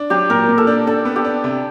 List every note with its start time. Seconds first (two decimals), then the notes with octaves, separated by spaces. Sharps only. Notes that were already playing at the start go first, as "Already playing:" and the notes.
Already playing: D4
0.10 F#3 G4
0.30 A#2 A#4
0.49 A#2
0.58 A4
0.67 D4
0.87 D4 A4
1.05 B3
1.16 G4
1.25 D4
1.44 C3